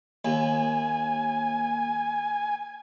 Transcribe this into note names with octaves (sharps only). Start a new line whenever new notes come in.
D#2 G#5